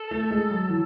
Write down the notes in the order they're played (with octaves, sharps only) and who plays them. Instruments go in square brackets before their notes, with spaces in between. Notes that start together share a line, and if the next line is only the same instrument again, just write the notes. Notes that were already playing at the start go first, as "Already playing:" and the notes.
Already playing: [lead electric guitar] A4
[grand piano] A3
G#3
F#3
E3